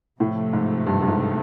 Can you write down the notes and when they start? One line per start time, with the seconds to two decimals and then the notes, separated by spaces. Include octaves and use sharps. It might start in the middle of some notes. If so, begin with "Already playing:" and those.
0.20 A2 C3 F3 A3
0.53 G#2
0.86 G2
1.01 G2
1.08 G#2